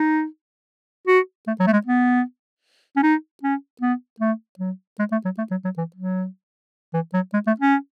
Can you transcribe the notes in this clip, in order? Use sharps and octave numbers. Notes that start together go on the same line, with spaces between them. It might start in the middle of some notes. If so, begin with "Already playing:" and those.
Already playing: D#4
F#4
A3
F#3
A3
G#3
B3
C#4
D#4
C#4
B3
A3
F#3
G#3
A3
F#3
A3
F#3
F#3
E3
F#3
E3
F#3
G#3
A3
C#4